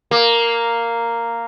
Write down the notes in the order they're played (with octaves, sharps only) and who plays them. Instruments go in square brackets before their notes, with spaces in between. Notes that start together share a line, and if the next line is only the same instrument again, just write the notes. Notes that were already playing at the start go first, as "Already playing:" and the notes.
[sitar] A#3